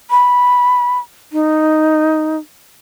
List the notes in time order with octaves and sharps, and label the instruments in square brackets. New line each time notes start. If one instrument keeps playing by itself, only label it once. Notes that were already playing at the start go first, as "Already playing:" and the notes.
[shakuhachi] B5
D#4